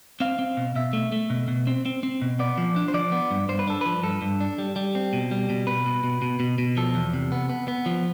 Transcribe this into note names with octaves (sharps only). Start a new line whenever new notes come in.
C4 F5
C4
B2
B2 E5
A3
A3
B2
B2
C4
C4
C4
B2
B3 D5
F3
D4
C5
F3 D5
B3
G2
G2 C5
B4
D4 A4
F3 B4
G2 A4
G2
D4
G3
G3
C4
B2
G3
B2
B2 B4
B2
B2
B2
B2
B2
F3 A4
E2
C3
B3
B3
B3
F3